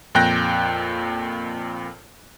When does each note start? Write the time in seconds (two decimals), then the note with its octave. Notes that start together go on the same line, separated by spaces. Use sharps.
0.15 F2 A#2 G5 F#6 G6 A#6